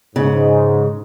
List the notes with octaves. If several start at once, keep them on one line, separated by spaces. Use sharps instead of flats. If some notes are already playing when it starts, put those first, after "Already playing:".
G#2 C#3